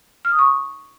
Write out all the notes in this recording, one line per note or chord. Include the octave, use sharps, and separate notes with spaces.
F6
D#6
C#6